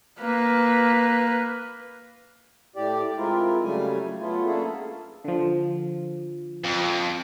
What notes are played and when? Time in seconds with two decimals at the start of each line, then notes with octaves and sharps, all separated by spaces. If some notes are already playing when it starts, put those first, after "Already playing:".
0.19 A#3 B4
2.76 A2 G4 D5
3.18 G#3 C4 E4 F4 A#4
3.64 C#3 F#3 G3 A3 G#5
4.21 F#3 A3 B3 E4 F4
4.46 A#3 C#4 D4 E4 G#4 A4
5.25 D3 F3
6.64 F2